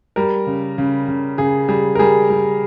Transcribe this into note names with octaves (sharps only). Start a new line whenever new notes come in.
G3 A#4
C#3
C#3
C#3
C#3 G#4
G3 G#4
A#4
G3 G#4
G3